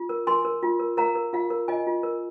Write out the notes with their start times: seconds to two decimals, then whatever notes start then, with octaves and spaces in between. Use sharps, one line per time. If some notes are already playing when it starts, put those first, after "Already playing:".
Already playing: F4
0.09 A#4
0.27 A#4 G#5 C6
0.45 A#4
0.63 F4
0.80 A#4
0.97 A#4 F5 A#5
1.15 A#4
1.33 F4 F5
1.50 A#4
1.68 F4 D#5 G#5
1.87 F4
2.03 A#4